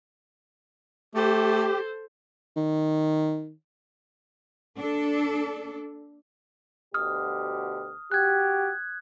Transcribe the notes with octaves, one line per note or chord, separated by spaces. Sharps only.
A3 G4 A4 C5
D#3
A#3 D4 A4
D2 B2 G4 D#6 F6
F#4 G4 F#6 G#6